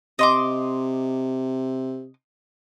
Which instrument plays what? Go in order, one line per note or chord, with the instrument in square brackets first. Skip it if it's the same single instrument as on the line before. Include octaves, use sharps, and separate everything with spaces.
[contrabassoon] C3 [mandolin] D#5 C6 D6